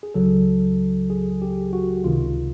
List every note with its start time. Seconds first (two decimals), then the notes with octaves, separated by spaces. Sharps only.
0.03 G#4
0.15 C#2 C#3 F#3 A4
1.10 G#4
1.42 G4
1.73 F#4
2.04 C#2 C3 D#3 F4